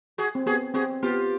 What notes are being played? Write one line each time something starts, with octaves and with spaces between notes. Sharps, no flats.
F#4 G#4
C4
B3 F#4 G#4
C4 F#4 G#4
B3 F4 G4